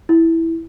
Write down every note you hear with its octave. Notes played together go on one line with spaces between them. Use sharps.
E4